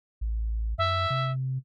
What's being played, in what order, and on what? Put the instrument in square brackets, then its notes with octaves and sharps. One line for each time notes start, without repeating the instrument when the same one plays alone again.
[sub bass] A1
[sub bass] F#2 [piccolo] E5
[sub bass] C3